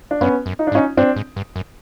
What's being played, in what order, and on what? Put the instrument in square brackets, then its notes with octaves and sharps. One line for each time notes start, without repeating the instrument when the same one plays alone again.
[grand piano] D4
[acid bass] F#2 [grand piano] B3 C#4
[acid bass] F#2
[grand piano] D#4
D4
[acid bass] G#2
[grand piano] C#4 D#4
[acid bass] G2 [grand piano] C4 D4
[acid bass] G#2
G2
F#2